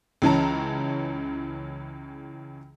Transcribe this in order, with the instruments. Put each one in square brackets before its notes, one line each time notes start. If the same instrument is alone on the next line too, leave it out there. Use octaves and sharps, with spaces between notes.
[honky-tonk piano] C#2 C#3 E3 C#4 A5 A#5